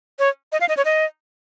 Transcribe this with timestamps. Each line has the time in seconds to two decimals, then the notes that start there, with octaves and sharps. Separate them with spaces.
0.19 C#5
0.52 D#5
0.61 F5
0.69 D#5
0.77 C#5
0.85 D#5